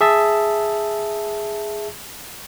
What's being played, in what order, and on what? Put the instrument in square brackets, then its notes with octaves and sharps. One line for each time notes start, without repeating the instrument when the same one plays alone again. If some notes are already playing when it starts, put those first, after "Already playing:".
[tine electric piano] G#4 E5 A5